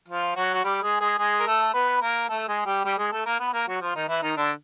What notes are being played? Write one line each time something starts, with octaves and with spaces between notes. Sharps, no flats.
F3 F4
F#3 F#4
F#4
G3 G4
G#3 G#4
G#3 G#4
G#3 G#4
A#4
A3 A4
B3 B4
A#3 A#4
A3 A4
G#3 G#4
G3 G4
G3 G4
G#3 G#4
A3 A4
A#3 A#4
B3 B4
A#3 A#4
F#3 F#4
F3 F4
D#3 D#4
E3 E4
D#3 D#4
D3 D4